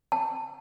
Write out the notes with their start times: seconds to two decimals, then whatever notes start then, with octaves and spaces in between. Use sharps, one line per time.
0.12 A5